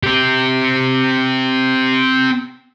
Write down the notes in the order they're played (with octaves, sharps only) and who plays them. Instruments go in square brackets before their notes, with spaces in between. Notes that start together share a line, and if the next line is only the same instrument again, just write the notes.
[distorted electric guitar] C4 G4